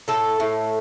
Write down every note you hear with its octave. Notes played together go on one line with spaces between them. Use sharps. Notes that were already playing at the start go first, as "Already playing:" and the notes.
A2 A4
A2